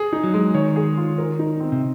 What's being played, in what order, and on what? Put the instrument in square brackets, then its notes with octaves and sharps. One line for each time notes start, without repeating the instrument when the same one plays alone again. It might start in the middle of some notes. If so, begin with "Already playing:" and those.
Already playing: [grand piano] G#4
D#4
[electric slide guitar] F#3
[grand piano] G#3
[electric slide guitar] D#3 [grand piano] C#5
[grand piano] G#4
F4
A#4
D#4
C4
[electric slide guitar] C3